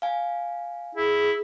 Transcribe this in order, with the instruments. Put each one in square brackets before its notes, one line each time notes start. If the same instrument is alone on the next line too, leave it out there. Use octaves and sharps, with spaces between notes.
[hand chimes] F5 G#5
[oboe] E4 [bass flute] G#4